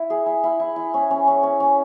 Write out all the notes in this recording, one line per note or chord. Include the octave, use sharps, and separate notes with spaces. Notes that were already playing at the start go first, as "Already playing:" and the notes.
Already playing: E4
G#4
E4
E4
E4
E4
C#4
C#4
C#4
C#4
C#4